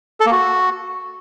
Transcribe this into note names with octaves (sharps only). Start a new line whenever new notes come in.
A4
A#3
F#4